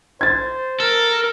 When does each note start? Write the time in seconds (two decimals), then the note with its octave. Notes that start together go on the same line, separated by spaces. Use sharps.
0.21 C5 G#6 A6
0.80 A4 A#4